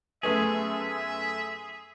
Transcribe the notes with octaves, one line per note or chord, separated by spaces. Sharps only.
F#2 A3 B3 G#4 E5